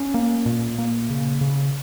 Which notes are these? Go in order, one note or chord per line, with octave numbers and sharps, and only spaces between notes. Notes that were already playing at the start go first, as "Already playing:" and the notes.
Already playing: C#4
A#3
A#2
A#3
C#3
C#3